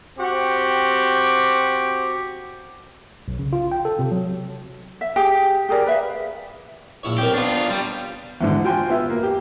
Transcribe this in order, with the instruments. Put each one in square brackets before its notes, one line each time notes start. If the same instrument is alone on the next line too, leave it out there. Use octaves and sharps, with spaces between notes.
[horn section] C4 F#4 G4
[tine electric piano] B1
C#3
F4
G5
A4
C3
F#3
[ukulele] E5
G4 G#4
G4 G#4 A#4 D5
B4 E5 F5
[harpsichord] A#1 E4 C#5
[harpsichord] B1 C4 A#4 [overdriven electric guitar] G4
[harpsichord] B3 C#5 [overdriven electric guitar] D4 F4
[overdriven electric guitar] G3
[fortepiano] E2 G#2 D3
F4 F#4 G5 G#5 C6
B3 F4 E5
A#3
G4